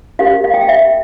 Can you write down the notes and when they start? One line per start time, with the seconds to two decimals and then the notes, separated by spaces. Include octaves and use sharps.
0.19 C#4 G4 A#4 F5
0.44 F5
0.54 G5
0.61 F5
0.69 E5